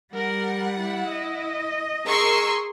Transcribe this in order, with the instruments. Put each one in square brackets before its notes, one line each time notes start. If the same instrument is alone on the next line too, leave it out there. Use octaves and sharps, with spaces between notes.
[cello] G3 [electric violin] A#4 [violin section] F#5
[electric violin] E4
[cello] D#5
[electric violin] G#4 C6 [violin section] A#4 C#6 E6